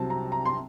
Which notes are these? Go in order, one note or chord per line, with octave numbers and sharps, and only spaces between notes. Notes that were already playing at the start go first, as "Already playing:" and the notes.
Already playing: C2 C3 F#3 C4 A5
A#5
A#5
C6